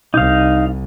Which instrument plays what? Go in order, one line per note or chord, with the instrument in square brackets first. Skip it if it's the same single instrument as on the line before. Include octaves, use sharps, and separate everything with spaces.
[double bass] C2 [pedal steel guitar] D#4 F5